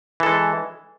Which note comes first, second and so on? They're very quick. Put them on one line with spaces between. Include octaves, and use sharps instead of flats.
E3 A4 G#3